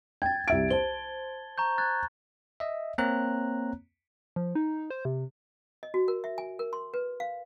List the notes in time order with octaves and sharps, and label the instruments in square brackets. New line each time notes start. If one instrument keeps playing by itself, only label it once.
[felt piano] G5 [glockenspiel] G#6 A6
[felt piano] C2 E5 D7
[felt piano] C5 [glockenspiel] A5 G7
[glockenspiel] A#5 C#6 G6
F#6 G#6 A6
[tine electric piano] D#5 E5
A#3 C4 C#5 A#5 F#6
[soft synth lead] F3
D#4
C5
C3
[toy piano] D#5
F#4
A#4
E5
G#5
A#4
C6
B4
F5